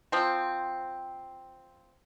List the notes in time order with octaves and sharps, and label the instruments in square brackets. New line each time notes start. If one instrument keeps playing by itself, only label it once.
[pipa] F3 C4